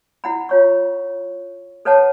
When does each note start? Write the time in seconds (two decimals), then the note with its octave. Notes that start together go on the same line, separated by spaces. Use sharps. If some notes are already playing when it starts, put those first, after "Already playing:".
0.24 E4 F#5 B5
0.49 F4 C#5 C#6
1.85 A4 B4 C#5 F#5 A5